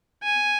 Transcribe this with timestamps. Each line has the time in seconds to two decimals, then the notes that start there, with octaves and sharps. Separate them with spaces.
0.23 G#5